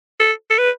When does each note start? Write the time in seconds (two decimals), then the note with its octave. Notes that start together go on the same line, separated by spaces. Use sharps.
0.20 A4
0.50 A4
0.58 B4